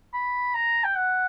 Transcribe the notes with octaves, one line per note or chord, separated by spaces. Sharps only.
B5
A#5
G5
F#5